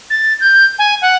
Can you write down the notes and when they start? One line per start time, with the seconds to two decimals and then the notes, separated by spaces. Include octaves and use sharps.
0.10 A6
0.41 G6
0.79 G#5
1.02 F#5